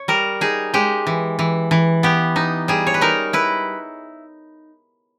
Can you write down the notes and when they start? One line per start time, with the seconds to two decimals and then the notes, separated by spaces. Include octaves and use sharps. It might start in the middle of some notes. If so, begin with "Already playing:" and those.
Already playing: C#5
0.08 G3 A#4
0.41 D#4 G#4
0.74 G#3 G4
1.07 E3
1.39 E3
1.71 E3
2.03 B3 G4
2.36 D#4
2.68 G3 G#4
2.87 C#5
2.94 B4
3.01 D#4 A#4
3.33 E4 B4